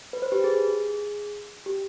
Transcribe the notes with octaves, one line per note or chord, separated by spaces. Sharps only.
B4
C5
G4 B4
G#4
G4